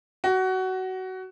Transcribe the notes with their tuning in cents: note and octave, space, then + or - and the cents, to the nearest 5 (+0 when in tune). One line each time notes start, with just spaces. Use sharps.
F#4 +20